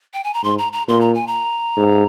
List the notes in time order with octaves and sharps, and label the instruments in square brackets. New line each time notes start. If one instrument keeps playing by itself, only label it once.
[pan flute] G5
G#5
A#5
[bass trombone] G#2 [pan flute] C6
[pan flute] A#5
A#5
[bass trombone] A#2 [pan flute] C6
[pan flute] A#5
G#5
A#5
[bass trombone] G#2